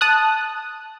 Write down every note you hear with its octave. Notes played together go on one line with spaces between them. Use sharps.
A5 D#6 F#6